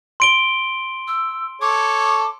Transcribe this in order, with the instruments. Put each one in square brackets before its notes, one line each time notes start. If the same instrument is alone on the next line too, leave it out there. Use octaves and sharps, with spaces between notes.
[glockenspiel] C6 D7 G7
[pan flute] E6
[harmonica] A4 C#5 [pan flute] D6